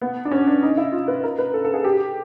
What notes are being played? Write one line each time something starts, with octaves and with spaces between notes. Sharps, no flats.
B3
D4
C#4
D4
D#4
E4
F4
B4
A#4
B4
A4
A4
G#4
G4